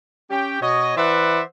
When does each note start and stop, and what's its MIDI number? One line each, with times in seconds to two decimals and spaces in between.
0.31 0.57 61
0.31 0.57 67
0.31 0.57 79
0.61 0.96 47
0.61 0.96 73
0.61 0.96 75
0.97 1.41 52
0.97 1.41 71
0.97 1.41 72
0.97 1.41 74
0.97 1.41 76
0.97 1.41 78